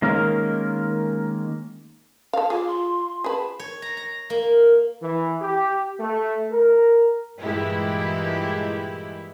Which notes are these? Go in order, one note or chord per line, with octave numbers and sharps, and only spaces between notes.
D#3 G#3 A#3 C#4 A#4
A4 F5
F4 G#4 D6
C6
G#4 B4 A5
C#5
A#5
A#5
A#3
E3
G4
A3
A#4
G2 A#2 E3 G#3 E4 G4